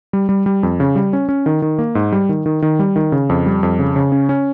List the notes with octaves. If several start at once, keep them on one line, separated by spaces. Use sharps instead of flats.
G3
G3
G3
F2
C#3
G3
C#4
C#4
D#3
D#3
A#3
G#2
G3
D#3
D#3
D#3
G3
D#3
C#3
F2
G3
F2
C#3
C#3
C#4
C#4